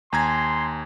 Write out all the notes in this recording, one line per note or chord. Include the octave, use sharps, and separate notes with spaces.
D#2 G#5 A#5 C6 G#6